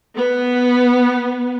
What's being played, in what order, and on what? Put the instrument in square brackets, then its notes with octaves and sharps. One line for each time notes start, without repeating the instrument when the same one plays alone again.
[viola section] B3